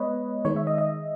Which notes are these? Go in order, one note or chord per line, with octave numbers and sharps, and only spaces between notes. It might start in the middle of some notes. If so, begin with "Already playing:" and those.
Already playing: G#3 B3 B4 C#5 D#5
D#3 G#3 D#4 C#5
E5
D#5
D#5